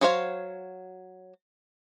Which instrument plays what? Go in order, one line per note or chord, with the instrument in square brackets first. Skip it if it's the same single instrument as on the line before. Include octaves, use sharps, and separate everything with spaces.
[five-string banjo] F#3 F#4 C5 C#5 F5